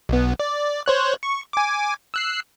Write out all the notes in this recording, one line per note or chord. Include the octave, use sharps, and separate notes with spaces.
B1 B3
D5
C5 C#5 F#6
C#6
G#5 D6
E6 F#6 C7